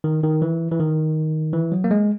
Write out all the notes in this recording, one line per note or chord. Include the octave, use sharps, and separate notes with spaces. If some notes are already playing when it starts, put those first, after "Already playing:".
D#3
D#3
E3
E3
D#3
E3
F#3
A#3
G#3